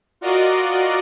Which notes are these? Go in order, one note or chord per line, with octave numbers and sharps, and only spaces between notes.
F4 F#4 A#4 D5 D#5